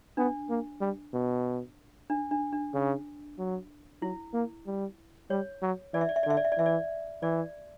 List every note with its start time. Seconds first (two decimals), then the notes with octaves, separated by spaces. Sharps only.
0.17 B3 D4
0.49 A#3
0.81 G3
1.14 B2
2.10 D4
2.31 D4
2.52 D4
2.74 C#3
3.38 F#3
4.02 F#3 E4
4.34 A#3
4.66 G3
5.30 G3 C#5
5.62 F#3
5.94 E3 D5
6.01 E5
6.09 D5
6.16 E5
6.23 D5
6.26 D3 E5
6.37 D5
6.45 E5
6.52 D5
6.58 E3 E5
6.66 D5
7.22 E3 D5